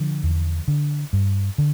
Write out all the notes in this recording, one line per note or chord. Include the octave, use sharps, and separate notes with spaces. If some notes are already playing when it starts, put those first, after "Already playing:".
Already playing: D3 F3
E2
D3
G2
D3